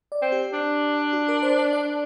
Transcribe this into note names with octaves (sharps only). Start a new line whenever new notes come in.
D5
C4
G4
D4
F#4
A#4
C5
D5
D5